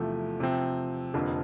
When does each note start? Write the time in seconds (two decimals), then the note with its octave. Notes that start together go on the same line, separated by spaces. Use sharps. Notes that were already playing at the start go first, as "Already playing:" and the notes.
Already playing: E2 C3 F3 A3
0.40 C3 F3 C4
1.14 F1 F2 D3 F3 A#3